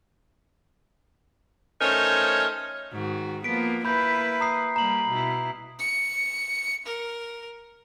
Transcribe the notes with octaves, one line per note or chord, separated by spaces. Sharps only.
A3 C#4 D#4 A#4 C5 C#5
G#2 D#3 F#4
F3 A#3 B3 B6 D7
A#3 E4 B4 B5 G6
A#5 D#6 C7
G3 A#3 A#5 F#7
B2 E4
C#7
A#4